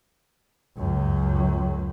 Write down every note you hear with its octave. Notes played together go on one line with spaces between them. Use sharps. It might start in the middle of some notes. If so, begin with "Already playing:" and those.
C#2 F#2